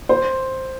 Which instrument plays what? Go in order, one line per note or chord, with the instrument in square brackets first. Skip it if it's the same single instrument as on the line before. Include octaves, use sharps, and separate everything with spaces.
[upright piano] C5